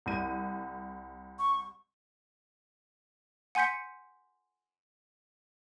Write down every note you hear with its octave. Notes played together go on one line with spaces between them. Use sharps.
C2 D#7
C#6
F#5 G#5 C6 G6 B6 C#7